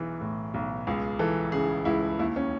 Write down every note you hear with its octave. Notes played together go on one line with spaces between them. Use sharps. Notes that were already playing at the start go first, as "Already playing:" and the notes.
Already playing: B1 E3 G#4
A2
B1
C#2 G#4
E3 A4
C#3 G#4
C#2 E4
D#2 E4
C#4